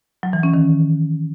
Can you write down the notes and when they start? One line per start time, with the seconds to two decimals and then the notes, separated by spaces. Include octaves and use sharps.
0.23 F#3
0.33 E3
0.43 C#4
0.54 D#3